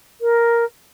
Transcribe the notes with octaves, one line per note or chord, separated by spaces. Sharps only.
A#4